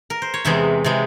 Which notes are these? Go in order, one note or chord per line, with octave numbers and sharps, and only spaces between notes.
A#4
C5
C#5
E2 C3 E3 G#3 E5
C3 E3 G#3